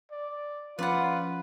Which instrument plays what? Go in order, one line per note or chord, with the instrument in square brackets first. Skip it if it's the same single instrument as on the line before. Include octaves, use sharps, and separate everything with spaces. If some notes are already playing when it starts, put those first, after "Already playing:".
[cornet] D5
[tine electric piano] F3 C#4 B5 [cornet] F4 [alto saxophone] B4 [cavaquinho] D5 F#5